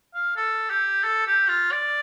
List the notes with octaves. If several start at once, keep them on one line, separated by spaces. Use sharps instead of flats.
F5
A4
G4
A4
G4
F4
D5